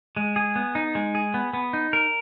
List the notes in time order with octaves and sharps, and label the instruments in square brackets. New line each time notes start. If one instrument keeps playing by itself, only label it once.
[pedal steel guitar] G#3
G#4
B3
D#4
G#3
G#4
B3
B3
D#4
A#4